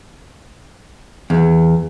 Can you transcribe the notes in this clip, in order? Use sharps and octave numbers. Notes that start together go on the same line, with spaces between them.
E2